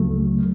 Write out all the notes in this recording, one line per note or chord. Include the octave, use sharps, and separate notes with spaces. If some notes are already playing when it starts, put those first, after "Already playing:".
Already playing: C#2 C#3 F#3 A3